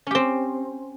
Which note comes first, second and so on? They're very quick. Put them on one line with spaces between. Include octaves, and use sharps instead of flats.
C#4 G4 C4